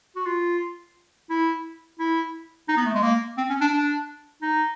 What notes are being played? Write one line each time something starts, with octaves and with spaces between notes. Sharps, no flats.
F#4
F4
E4
E4
D#4
B3
A3
G#3
A#3
C4
C#4
D4
D4
D#4